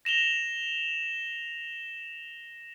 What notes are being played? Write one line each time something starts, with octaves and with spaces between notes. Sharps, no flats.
A#6 E7 F7 G7